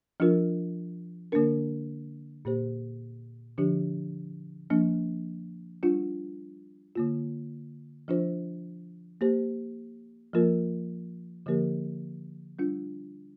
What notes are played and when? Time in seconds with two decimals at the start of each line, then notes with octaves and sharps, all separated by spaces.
0.20 F3 D4 F4 A#4
1.32 D3 A#3 D4 A#4
2.45 A#2 A#3 G4 C5
3.58 D3 F3 D4 G4
4.70 F3 A#3 D4
5.83 G3 D4 F4
6.95 D3 A#3 F4
8.08 F3 D4 F4 C5
9.21 A#3 G4 C5
10.33 F3 A#3 F4 A#4
11.46 D3 F3 A#3 G4 A#4
12.59 G3 D4 F4